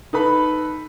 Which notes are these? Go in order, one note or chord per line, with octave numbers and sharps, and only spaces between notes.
D#4 A4 B4 B5